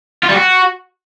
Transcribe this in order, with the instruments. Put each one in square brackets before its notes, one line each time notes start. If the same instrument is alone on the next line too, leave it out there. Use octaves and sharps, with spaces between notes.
[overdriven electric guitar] F4
G3
F#4